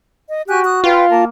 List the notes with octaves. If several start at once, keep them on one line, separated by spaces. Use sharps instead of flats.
D#5
F#4 G4 G#5 F#6
D#6 F#6
F4 B4 F5 G5
A#3 A#4 A5